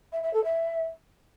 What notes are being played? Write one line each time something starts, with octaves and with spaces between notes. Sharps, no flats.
E5
E5
A4
E5